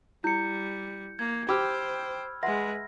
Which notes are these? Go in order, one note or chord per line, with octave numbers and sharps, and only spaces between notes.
G3 E4 G6 C#7
A#3 G#6
G4 C5 G5 B5 E6 F6
G#3 B4 E5 F#5 C6 A#6